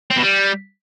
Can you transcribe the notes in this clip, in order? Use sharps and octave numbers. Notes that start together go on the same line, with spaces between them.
C4
B2
G3